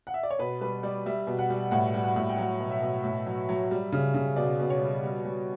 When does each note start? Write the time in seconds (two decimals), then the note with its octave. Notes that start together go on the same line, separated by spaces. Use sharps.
0.07 F#5
0.14 E5
0.23 D5
0.31 C#5
0.39 B2 B4
0.61 G3 B4
0.83 G3 D5
1.06 G3 E5
1.27 B2
1.39 F#5
1.50 G3
1.71 A2 F#5
1.94 G3
2.04 F#5
2.16 A2
2.29 G5
2.38 F#3 F#5
2.60 B2
2.71 E5
2.82 B2
3.04 A2
3.26 F#3
3.49 F#3
3.71 G3
3.92 C#3
4.14 C#3
4.36 B2 D5
4.59 B2
4.70 C#5
4.81 G3
5.04 G3
5.25 G3